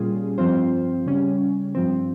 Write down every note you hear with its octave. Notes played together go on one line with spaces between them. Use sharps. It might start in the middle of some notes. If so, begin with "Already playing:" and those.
Already playing: A#2 G3 C#4 F4 G#4
G2 F3 C4 F4 C5
C#3 G3 C#4
G2 F3 C4